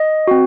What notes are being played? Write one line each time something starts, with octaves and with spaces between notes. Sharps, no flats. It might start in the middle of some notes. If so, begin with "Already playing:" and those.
Already playing: D#5
C4 F#4